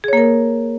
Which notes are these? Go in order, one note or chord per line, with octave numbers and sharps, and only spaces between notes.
A#3 G#4 A#4 C#5